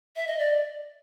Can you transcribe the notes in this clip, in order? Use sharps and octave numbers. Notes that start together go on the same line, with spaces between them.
E5
D#5
D5